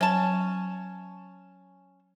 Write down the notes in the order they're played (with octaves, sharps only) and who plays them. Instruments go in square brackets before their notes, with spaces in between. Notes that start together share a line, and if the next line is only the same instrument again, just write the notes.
[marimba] F#3 [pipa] C#4 A5